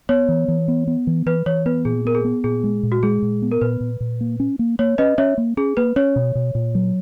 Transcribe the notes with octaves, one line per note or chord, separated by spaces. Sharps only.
B3 C#5
E3
E3
B3
B3
E3
E3 B4
E3 C#5
B3 B4
A#2 G#4
B3 A#4
G#4
B3
A#2 G#4
G#3
A#2
F#4
G#3 G#4
A#2
B3
A#4
A#2 B4
A#2
A#2
A#3
C#4
A#3
A#3 C#5
C#4 B4 D#5
C#4 C#5 E5
A#3
C#4 G#4
A#3 B4
C#4 C#5
B2
B2
A#2
F#3